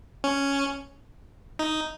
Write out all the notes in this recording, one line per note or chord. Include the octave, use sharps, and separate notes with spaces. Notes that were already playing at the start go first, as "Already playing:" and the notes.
C#4
D#4